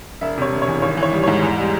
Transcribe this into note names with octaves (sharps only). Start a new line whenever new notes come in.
E1 E5
C3 C#5
E1
C#5
E2
G#1 C#5
E3
C#5
G3
C#5
G#2
E2
G3